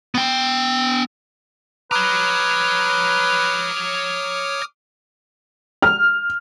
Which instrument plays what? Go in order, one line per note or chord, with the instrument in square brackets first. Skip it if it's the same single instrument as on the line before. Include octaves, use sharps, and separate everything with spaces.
[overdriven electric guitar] B3 G5
[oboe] B4 [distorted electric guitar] C#5 A#5 [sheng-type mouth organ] D6 D#6 F6
[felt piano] F6